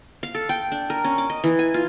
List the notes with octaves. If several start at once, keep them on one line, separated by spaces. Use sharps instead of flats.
F5
A4
G5
D4
A#4
C#4
D6
D#5
E3
G#5
F4